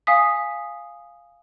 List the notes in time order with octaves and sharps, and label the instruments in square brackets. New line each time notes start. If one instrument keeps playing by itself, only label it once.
[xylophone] F5 G#5 D#6 B6